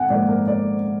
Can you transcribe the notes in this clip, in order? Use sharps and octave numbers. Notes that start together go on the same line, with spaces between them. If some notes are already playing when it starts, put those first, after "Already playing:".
Already playing: G#1 F#5 G#5
G#2 F3 A#3 D5
A#4
D5